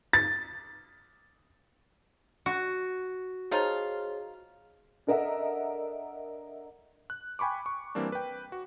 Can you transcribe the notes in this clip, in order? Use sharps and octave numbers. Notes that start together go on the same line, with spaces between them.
A6
F#4
F3 D#4 F4 G#4 C5 C#5 A#5
D4 A4 A#4 D#5 E5 F#5
F#6
G5 G#5 B5 C#6 D6
C#6
E3 G3 A#3 C4 D4
B4 G5
F#4